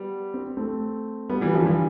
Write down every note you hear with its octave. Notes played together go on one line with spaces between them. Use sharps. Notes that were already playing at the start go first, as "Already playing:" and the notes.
Already playing: G3 B3
C4
A3 C4
G3 B3
E3 G3
D3 F3
E3 G3